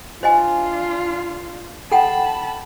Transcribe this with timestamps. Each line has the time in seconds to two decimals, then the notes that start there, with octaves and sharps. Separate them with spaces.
0.23 D4 F4 C5 D#5 G#5
1.92 A4 F#5 G5 A5 B5